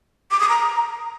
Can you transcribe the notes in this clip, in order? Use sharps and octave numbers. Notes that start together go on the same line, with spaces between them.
D6
D#6
A#5